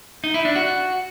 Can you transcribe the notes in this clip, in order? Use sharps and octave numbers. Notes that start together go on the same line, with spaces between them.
D#4
E4
D4
F#4